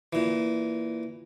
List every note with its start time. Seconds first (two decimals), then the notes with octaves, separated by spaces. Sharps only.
0.13 A#2 E3